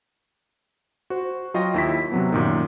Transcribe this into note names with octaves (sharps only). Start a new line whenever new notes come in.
F#4 C5
F#3 F4 D#5 G5 C#6 A#6
D#2 E4 B6
C3 F#3 B3
F#2 A#2 D#3